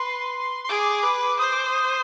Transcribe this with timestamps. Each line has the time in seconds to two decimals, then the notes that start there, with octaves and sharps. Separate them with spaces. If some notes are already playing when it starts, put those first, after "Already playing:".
Already playing: B4 C6
0.64 C6
0.69 G#4 D6
1.04 B4
1.39 C5 D#6
1.53 D6
1.66 D#6